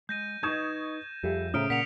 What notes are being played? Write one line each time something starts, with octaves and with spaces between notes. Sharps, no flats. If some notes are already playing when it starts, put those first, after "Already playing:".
G#3 G6 A#6 D#7
D#4 B4 D#5 C#6 D#6 G6 G#6 E7
F2 G3 G#4 A4 E5
A2 C#3 C5 E5 A#5 D#6 F6 D7
A#2 F#5 B6 C#7 F7